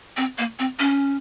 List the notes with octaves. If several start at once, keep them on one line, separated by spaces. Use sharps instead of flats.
C4
A#3
C4
C#4